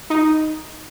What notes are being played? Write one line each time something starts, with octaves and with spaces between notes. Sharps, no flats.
D#4